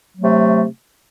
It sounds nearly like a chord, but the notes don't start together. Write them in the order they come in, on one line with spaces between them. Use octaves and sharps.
F#3 A3 C3